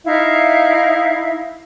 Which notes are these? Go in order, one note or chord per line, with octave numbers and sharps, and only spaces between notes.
D#4 E4 E5 F5